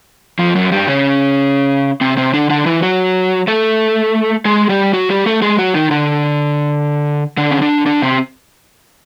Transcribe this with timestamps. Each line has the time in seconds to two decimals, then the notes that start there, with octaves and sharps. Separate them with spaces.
0.39 F2 F3
0.55 F#2 F#3
0.72 G2 G3
0.87 C#3 C#4
2.01 C3 C4
2.17 C3 C4
2.34 D3 D4
2.50 D3 D4
2.66 E3 E4
2.82 F#3 F#4
3.47 A3 A4
4.45 G#3 G#4
4.69 G3 G4
4.94 F#3 F#4
5.10 G3 G4
5.26 A3 A4
5.42 G#3 G#4
5.59 F#3 F#4
5.75 D#3 D#4
5.91 D3 D4
7.37 D3 D4
7.51 C#4
7.62 D3 D4
7.86 D3 D4
8.02 C3 C4